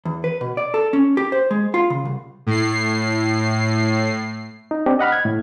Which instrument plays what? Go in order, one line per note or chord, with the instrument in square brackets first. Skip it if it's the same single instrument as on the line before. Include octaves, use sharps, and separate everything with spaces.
[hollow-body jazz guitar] E2
B4
B2
D5
A4
C#4
G4
C5
G#3
F4
C#3
C2
[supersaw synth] A2 C7
[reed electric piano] D#4
C4 D4 G4
D#5 F#5 B5 F6
G#6
A2